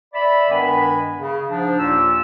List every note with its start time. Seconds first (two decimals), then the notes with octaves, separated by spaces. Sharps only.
0.14 D5 E5 B5
0.50 G2 D#3 G#3 B3 G#5 B5
1.18 C#3
1.49 G#2 F3 D4
1.78 D#2 A#2 F4 G4 E6